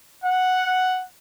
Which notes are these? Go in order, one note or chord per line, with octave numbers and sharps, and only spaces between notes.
F#5